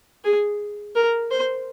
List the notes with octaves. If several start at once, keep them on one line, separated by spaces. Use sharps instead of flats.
G#4
A#4
C5